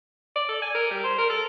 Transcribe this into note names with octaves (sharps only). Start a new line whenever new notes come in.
D5
A4
G#5
A#4
G3
C5
A#4
A4